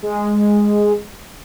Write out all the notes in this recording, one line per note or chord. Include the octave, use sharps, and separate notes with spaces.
G#3